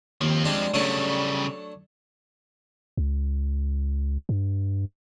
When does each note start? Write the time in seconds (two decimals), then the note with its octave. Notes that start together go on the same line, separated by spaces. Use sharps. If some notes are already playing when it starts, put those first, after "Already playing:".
0.21 D#2 F3 C4
0.45 G3 G#3 D4
0.74 C#3 F#3 G3 A3 D4
2.97 C#2
4.29 G2